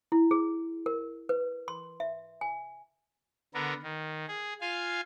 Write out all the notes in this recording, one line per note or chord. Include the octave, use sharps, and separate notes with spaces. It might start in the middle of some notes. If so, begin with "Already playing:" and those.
E4
G#4
A#4
B4
C6
E5
G#5
D3 B3 A#4
D#3
G#4
F4 F5 G#5